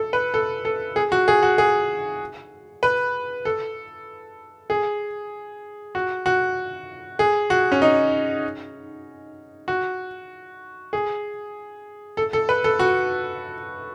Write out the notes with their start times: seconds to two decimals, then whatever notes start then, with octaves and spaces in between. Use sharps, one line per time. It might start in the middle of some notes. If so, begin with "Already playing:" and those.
Already playing: A4
0.13 B4
0.34 A4
0.65 A4
0.96 G#4
1.12 F#4
1.28 G#4
1.43 F#4
1.58 G#4
2.83 B4
3.45 A4
4.70 G#4
5.95 F#4
6.26 F#4
7.19 G#4
7.50 F#4
7.72 C#4
7.82 D#4
9.68 F#4
10.93 G#4
12.17 A4
12.33 A4
12.49 B4
12.64 A4
12.79 F#4